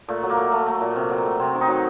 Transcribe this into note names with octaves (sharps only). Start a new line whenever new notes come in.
A#2 A3
F#3
A#3
A3
A3
A3
A#2
C3
F#3
A3
C3 C4
D#3
D#4
F#3